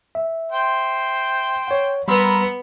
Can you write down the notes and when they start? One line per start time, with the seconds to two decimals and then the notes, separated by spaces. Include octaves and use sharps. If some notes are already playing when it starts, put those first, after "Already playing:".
0.15 E5
0.52 C5 G5
1.68 C#5 F#5
2.08 G3 B3 A#4 B5 C6 E6